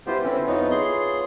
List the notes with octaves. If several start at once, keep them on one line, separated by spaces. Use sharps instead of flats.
B3 E4 F4 G4 B4 C5
D3 C4 C#4
F2 B3 D#4 F4 C#5
G#4 C6